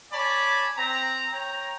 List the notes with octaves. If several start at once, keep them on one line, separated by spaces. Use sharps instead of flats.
C#5 D5 G#5 A5 B5
C4 A#5
C#5 G5 A#5